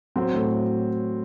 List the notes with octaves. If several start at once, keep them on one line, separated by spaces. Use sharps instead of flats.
F#3 C4
A2